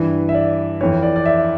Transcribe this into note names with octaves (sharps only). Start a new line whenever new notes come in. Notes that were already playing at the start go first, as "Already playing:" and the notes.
Already playing: G2 E3
E5
D5
F2 E3 C#5
D5
D5
E5